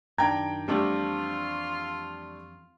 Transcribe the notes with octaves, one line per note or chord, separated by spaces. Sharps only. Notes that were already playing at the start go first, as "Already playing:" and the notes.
F#2 D#3 D4 G5 A#5 G#6
F2 E3 G3 A3 C4 D4 F4